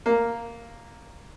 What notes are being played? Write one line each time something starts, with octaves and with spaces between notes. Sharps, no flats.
A#3